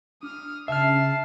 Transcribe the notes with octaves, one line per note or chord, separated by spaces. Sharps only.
D4 D#6 F6
C#3 E5 A5 F6 C7